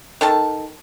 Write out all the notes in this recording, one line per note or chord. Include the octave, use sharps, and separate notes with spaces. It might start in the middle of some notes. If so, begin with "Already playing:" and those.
D#3 A4 A5